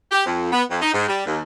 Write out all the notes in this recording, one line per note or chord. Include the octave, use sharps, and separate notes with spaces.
G4
F2
B3
F2
D#4
G#2
G3
D#2